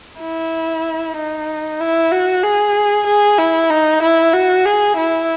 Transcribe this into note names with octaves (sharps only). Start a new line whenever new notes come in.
E4
D#4
E4
F#4
G#4
G#4
E4
D#4
E4
F#4
G#4
E4